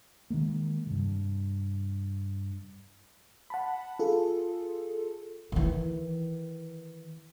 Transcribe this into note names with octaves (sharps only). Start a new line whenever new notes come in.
D#3 F#3 G#3 A#3
G2 C3
F#5 A5 B5
F4 G#4 A4
D#3 E3